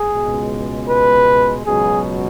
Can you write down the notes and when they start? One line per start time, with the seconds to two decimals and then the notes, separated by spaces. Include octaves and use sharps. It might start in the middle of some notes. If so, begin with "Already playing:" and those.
Already playing: G#4
0.11 C#2 B2 G#3
0.88 B4
1.65 C#2 B2 F#3 G#4